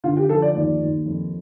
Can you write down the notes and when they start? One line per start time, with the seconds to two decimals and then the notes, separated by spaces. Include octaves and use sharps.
0.04 D3 F4
0.17 G4
0.29 F3 A4
0.42 D5
0.55 D#2 D5
0.81 D#2
1.06 F2